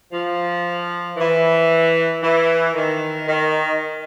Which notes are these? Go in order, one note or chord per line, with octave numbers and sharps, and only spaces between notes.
F3
E3
E3
D#3
D#3